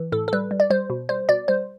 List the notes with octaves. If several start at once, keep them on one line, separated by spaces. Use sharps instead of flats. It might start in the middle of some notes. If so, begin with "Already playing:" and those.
Already playing: E3
A2 A4
A4
G3 B4
G3
D5
G3 C5
B2
G3 C5
B2 D5
G3 C5